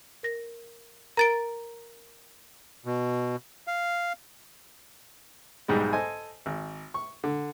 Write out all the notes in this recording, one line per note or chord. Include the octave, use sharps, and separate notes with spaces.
A#4 A#6
A#4 A#5 A6 D7
B2
F5
B1 G#2 G3 G#3
A4 C5 D#5 G#5
G#1
C#6
D3